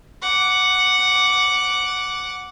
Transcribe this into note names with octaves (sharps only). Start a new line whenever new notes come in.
F#5 D6